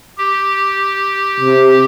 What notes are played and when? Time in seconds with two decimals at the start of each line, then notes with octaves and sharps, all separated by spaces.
0.18 G4
1.40 C3